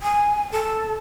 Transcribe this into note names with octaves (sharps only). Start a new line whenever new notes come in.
G#5
A4